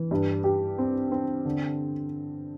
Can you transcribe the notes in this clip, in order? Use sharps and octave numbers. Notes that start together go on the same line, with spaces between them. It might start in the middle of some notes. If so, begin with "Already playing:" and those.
Already playing: E3
G2
G4
C4
C4
D3